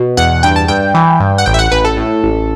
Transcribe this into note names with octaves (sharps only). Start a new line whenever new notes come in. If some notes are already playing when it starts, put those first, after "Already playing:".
Already playing: B2
E2 F#5
G2 G5
A5
G2 G5
E3
G2
F#5
A1 G5
E5
F#5
A1 B4
A4
A2
A1